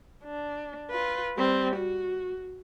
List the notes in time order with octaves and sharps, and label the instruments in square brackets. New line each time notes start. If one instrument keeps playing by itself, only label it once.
[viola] D4
F4 B4
G3 C4
F#4